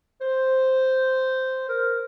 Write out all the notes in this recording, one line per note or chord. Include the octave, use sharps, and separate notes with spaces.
C5
A#4